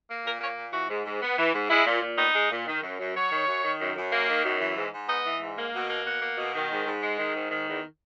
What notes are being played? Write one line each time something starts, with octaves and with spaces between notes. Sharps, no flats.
A#3
A#2 A#4
A#3 C#5
A#2
E3 F#4
G#2
G#2
B3
E3
G#2
G#3 E4
A#2
A#2
B3 D#4
G#3
A#2
D#3
F#2
F#2
F#3 C#5
D#3
F#2
D#3
F#2
F#2
A#3
D#3
F#2
E3
G#2
G#2
B3 D#5
E3
G#2
A#3
B2
A#3
B2 F#5
A#3
B2
D#3
G#2
G#2
G#3
D#3
G#2
D#3
E2